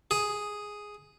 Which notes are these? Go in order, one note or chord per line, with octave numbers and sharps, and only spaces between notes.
G#4